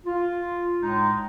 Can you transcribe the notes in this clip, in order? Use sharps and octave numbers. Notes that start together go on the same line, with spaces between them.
F4
A2 G#3 D#4